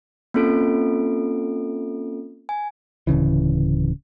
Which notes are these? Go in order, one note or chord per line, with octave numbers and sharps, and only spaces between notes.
A#3 C4 C#4 F4 A4 D7
G#5
D1 C#2 C#3 E3